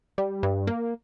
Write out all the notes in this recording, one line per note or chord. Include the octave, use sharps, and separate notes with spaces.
G3
G2
A#3